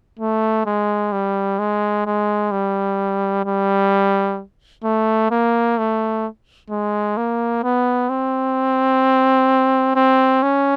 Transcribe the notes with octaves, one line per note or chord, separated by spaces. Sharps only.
A3
G#3
G3
G#3
G#3
G3
G3
A3
A#3
A3
G#3
A#3
B3
C4
C4
C#4